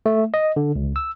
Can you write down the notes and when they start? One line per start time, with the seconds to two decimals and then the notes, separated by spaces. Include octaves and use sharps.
0.06 A3
0.34 D#5
0.56 D3
0.75 C#2
0.96 E6